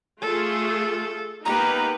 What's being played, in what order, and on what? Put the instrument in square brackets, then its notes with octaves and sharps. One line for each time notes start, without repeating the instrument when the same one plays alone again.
[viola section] A3 F4 G#4 [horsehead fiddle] A4
[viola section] A#3 B3 D#4 [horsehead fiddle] G4 B4 [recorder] A#5